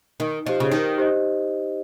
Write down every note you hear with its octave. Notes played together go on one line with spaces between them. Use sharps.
D#3 D#4
F3 G4 C5 D#5
C#3
D#3 D#4
G4 C5 D#5